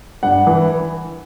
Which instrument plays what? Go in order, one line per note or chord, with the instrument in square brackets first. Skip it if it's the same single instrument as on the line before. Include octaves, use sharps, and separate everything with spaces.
[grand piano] G2 F#5
E3